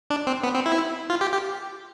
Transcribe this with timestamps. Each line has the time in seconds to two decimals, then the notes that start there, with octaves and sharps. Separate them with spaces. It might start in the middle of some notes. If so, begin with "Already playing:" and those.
0.10 D4
0.27 C4
0.44 B3
0.55 C4
0.66 E4
1.10 F4
1.21 G4
1.32 G4